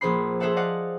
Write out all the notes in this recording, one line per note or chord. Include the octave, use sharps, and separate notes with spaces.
A#1 G#4 C5 B5 C7
G#4 A4 C5 E5 F#5 A5
D5 D#5 F5 F#5